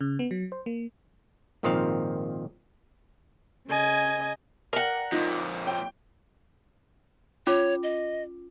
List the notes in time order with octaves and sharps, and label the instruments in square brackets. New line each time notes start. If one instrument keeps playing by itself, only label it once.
[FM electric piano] C#3
B3
F#3
C5
A#3
[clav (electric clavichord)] G#1 A#2 D#3 F3 C4 F5
[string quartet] C#3 D#5 G#5 G#6
[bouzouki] A#4 F#5 [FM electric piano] D5 G5
[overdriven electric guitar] F2 A#2 [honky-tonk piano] D#4 [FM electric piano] F4
[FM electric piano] C#5 [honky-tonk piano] G5
[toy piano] C#4 F4 D6 [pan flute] C#5
[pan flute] D#5